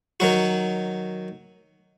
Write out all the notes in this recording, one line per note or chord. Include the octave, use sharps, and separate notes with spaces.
D#3 F#3 F#4